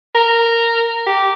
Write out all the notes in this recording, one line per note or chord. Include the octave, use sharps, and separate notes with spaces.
A#4
G4